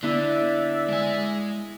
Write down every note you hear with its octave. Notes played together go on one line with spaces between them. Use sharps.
D3 B3 E4 D5 E5
G#3 G#5